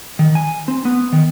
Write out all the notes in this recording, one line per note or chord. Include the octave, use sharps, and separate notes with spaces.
D#3
G#5
C4
B3
D#3